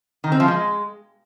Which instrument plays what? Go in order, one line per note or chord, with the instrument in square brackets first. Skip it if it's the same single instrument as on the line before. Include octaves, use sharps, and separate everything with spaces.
[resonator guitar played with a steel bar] D#3
C4
F3
G#3